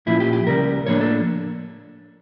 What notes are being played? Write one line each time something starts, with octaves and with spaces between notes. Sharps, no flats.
A#2 F3 C#4 E4
G4
G4
C#2 C#3 G3 A#4
A2 F3 A#3 D4 C#5
A4